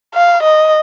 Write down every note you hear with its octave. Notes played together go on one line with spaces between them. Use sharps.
F5
D#5